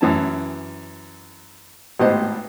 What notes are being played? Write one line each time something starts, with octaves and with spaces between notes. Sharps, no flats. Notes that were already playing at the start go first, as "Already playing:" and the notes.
F#2 E3 C#4 A5
G#1 A2 B3 G4 C5 D#5